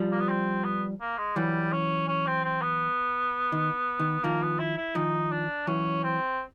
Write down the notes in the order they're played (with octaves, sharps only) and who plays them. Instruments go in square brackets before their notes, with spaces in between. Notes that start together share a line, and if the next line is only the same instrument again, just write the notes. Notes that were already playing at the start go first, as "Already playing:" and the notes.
Already playing: [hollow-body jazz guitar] F3 G3
[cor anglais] A#3
B3
C4
B3
A#3
G#3
[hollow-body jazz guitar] E3 F#3 [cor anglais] G3
[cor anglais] C#4
C#4
C4
C4
B3
[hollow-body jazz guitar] D#3
D#3
[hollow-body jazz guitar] D#3 F3 [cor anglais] A#3
[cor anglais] B3
E4
E4
[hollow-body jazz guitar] D#3 F3 [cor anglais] D#4
[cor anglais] D4
[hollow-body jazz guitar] E3 F#3 [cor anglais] C#4
[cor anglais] C4